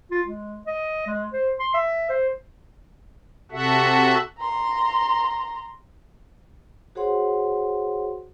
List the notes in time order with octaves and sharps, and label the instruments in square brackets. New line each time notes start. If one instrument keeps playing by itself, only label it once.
[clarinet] F4
G#3
D#5
G#3
C5
C6
E5
C5
[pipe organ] C3 F#4 A4 E5 F#5
[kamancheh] A#5 C6
[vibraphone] F#4 G#4 C5 C#5 F#5 C6